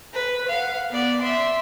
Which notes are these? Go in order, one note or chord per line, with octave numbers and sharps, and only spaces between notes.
B4
F5 F#5
B3 D5
E5 C6